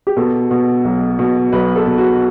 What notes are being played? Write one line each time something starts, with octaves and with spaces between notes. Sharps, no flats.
G4
B2 A4
B2
B1
B2
B1 B4
A4
B2
F#4